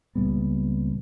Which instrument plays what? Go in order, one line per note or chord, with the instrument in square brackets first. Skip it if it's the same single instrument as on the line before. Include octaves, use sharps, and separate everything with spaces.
[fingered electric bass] C#2 A#2 G3 B3